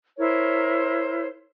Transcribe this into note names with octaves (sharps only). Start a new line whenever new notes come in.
E4 A#4 C5 C#5